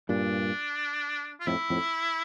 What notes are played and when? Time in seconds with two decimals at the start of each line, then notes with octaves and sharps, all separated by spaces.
0.09 G2 A#2 D4
1.40 F4
1.47 F2 A2 E4
1.70 F2 A2